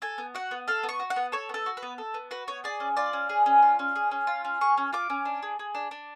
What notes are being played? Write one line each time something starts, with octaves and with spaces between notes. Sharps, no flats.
A4 G#5
B3
F#4 F#5
B3
A4 F5
B3
C#6
F#4
F#5
B3
A4 C#5
B3 A4
F#4
B4
B3
A4
B3
F#4 B4
B3 C#5
G#4 D5
C#4
F4 D5
C#4
G#4
C#4
F4
C#4
G#4
C#4
F4
C#4
G#4 C#6
C#4
F4 D6
C#4
D4
G#4
G#4
D4
D4